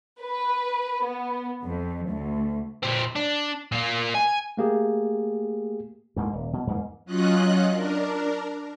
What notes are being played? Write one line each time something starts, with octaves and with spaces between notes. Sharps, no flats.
B4
B3
F2
D2
A#2 C4
D4
A#2 A#3
G#5
A3 A#3 G4 G#4
D2 G#2 A3 A#3
D#1
B2
E2 G#2 A#3
F#3 C#4 F4 D#5 F#6
D4 A#4